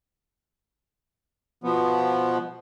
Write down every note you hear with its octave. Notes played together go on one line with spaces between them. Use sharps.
B2 F3 B3